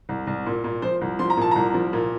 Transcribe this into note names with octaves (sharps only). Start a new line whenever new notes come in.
C2
C2
A#2
A#2
F3 C5
C2
F3 C6
A#5
A#2 A5
C2 A#5
F3
A#2